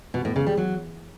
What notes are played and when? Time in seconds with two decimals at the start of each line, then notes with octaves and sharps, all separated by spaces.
0.14 B2
0.25 A2
0.36 C#3
0.47 G3
0.57 F#3